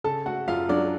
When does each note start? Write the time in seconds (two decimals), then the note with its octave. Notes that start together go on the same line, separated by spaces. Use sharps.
0.04 C#3 A4 A5
0.26 A3 F#4 F#5
0.48 F#2 F4 F5
0.69 F#3 D4 D5